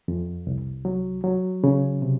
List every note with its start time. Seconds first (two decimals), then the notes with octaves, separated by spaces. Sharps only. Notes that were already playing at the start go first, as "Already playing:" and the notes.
0.08 F2
0.47 C2
0.85 F#3
1.24 F#3
1.64 C#3
2.02 C3